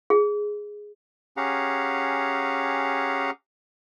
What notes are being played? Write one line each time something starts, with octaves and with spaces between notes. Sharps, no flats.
G#4
C#4 G4 G#4 F5 F#5 A#5